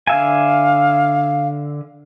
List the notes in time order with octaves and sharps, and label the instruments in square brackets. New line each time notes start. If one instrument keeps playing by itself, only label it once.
[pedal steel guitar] D3 E5 G#5 [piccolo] F5